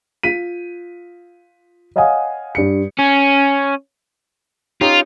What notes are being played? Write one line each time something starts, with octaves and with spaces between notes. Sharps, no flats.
F4 B6 D#7
C#5 D#5 F5 F#5 G#5 D#6
G2 C#7
C#4
C#4 D#4 F4 G4